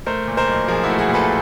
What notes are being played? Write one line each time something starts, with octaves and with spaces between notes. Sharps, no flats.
A3 A#4 C5
A#2
A#4 C5
B1
F3 G#4 A#4
E4 F#4
A3
F#4 G#4
A#2
A4 B4